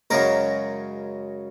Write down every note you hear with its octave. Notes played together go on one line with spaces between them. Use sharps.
F#2 C#3 G#3 A#4